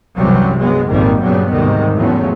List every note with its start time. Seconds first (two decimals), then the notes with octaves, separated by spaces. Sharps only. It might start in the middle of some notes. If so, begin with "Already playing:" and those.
0.16 C2 F#2 C3 E3 F#3 G3
0.58 G2 F#3 G#3 B3
0.87 G#1 F2 A#2 D#3 G3 A#3
1.22 G2 A#2 C#3 F#3 G3 B3
1.51 D2 G#2 C3 D#3 G3
1.96 E2 A2 F3 F#3 B3 C#4